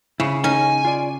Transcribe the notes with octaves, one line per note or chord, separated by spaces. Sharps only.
C#3 E4
C#4 D#4 G#5
F4 D5